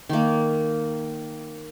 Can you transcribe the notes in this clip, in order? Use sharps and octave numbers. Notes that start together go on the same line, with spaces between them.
D#3 A#3